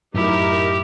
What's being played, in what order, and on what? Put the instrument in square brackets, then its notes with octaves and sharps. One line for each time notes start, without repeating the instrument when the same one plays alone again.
[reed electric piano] F#2 A2 [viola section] D#4 A#4 [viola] E4 [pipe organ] G4